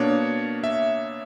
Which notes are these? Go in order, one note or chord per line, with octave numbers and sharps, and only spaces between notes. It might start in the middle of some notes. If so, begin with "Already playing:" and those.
Already playing: B2 A#3 D4 C#5
E5